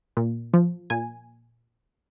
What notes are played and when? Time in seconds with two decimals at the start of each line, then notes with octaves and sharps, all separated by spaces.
0.17 A#2
0.54 F3
0.90 A#2 G#5